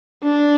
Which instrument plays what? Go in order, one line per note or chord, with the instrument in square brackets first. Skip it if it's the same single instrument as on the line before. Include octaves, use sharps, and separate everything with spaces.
[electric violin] D4